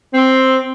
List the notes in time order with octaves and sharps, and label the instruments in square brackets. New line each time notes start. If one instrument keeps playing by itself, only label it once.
[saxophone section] C4